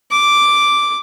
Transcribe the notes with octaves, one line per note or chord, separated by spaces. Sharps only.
D6